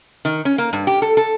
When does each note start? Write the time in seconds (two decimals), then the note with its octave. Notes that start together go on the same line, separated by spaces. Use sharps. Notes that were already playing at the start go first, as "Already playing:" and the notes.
0.25 D#3
0.45 C#4
0.58 A#3
0.73 G2
0.87 G4
1.02 A4
1.17 A4